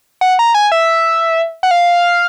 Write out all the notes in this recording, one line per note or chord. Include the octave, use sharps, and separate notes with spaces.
F#5
A#5
G#5
E5
F#5
F5